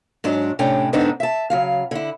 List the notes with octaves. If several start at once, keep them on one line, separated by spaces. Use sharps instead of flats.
G#2 F#3 D4
A2 C3 C#4 D4 G5
G#2 D3 B3 C4 D4 D#4
E5 A5
C#3 F#3 F5
D3 E4